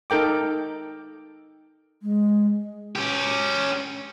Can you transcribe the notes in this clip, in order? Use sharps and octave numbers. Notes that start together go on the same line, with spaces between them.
D#4 A4 A#4 G5 D6
G#3
C#4 G4